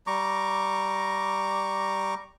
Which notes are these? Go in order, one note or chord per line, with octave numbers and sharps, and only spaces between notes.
G3 A#5 C#6 D6